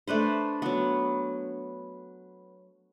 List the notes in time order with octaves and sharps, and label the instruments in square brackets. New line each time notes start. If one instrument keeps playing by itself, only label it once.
[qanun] A3 D4 B4 C5
F#3 B3